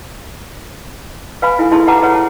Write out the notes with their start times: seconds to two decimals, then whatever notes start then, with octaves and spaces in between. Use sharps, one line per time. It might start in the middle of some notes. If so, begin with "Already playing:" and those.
1.42 B4 F5 G#5 B5
1.59 E4 A4 G#5
1.72 E4 G#4 A4 A5 C6
1.87 G4 B4 F#5 A5 A#5 D6
2.01 E4 G#4 B4 C#5 F#5
2.14 A5